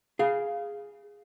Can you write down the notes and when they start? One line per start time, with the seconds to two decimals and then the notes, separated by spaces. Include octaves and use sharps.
0.19 G#4 F5